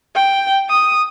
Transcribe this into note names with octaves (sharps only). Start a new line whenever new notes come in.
G5
D#6